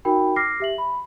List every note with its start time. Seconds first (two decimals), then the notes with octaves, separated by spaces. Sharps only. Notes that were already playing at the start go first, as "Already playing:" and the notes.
0.05 D#4 F#4 A#4 G5 B5
0.36 D6 F6 A#6 C7
0.60 G4 E5 F#7
0.78 B5